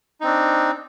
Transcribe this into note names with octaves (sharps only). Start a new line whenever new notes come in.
C4 D4 D#4